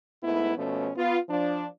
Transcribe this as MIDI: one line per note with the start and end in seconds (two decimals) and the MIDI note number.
0.22 0.53 44
0.22 0.53 57
0.22 0.53 59
0.22 0.53 64
0.56 0.90 47
0.56 0.90 53
0.56 0.90 57
0.56 0.90 61
0.96 1.17 59
0.96 1.17 65
1.29 1.66 53
1.29 1.66 62